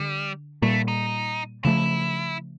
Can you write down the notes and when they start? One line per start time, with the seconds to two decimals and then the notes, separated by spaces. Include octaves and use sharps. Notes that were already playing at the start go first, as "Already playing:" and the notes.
Already playing: D3 G3
0.62 A#2 G3 A3 A#3
0.88 D#4
1.65 C#3 F3 A3 E4